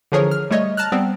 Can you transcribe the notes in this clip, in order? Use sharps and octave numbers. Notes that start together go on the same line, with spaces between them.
D3 E3 F3 G#4 A#4 C#5
F6
G3 A3 C#5 D#5
A5 A#5 F6 F#6
G3 B3 C4